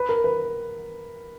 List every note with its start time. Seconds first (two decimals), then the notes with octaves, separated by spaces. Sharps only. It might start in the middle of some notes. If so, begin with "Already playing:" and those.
Already playing: B4
0.09 A#4
0.24 B4